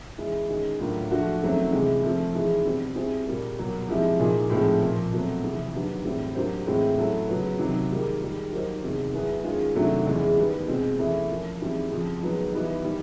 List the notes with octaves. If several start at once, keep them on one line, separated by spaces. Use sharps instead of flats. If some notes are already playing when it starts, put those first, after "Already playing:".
E3 G#3 C#4 E4
D#3 G#3 C#4
A2 F#3 A#3 D4 F4
F3 A3 D4 F#4
F#2 D#3 F#3 A3 C4
C3 E3 G#3
F3 A3 C4
G#2 E3 G#3
B2 G3 C4
G3 C4 E4 G#4 C5
A#2 G3 A#3
B2 F#3 A#3
F3 G#3 C4 E4 G4
A#2 F3 A#3 D#4 G#4
A2 F3 G#3 C4 D#4
A#2 F3 A#3
B2 F#3 A3 C4
F2 C3 E3
D#3 F#3 B3 D4 G4
A2 E3 G3 C4 E4
F#3 A#3 D4 G4 C5
A2 E3 G#3 C4
F#3 A3 C#4 E4 A4
C#3 F#3 B3
C3 D#3 F#3
G#2 D#3 G3 A#3
G#2 D#3 G3
F#3 A#3 D#4 G4 C5
E2 C3 D#3
F#3 B3 E4 G#4 B4
D#3 G#3 C#4 F4
C3 D#3 F#3 A3 D4
E2 C#3 E3 G#3
D#3 G3 B3
B2 G#3 C4
E3 A3 C#4 E4 G#4
F3 A#3 C#4
G#2 E3 G3 C4
F2 C#3 F3
G#2 D#3 F#3 B3
E3 G3 B3 D#4
D#3 G3